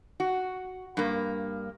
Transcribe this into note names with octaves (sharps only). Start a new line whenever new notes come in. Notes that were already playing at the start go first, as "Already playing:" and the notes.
F#4
G2 A#3